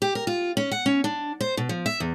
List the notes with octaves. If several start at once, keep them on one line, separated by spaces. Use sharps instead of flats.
G4
A#4
F4
C#4
F#5
C#4
D4
C5
B2
F3
E5
E2